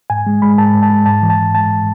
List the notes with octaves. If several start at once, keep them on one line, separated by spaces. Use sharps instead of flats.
G#2 G#5
G#3
G#3 B5
G#2 A5
G#2
A5
G#3
G#2 A5
E3
A5
G#2
G#3 A5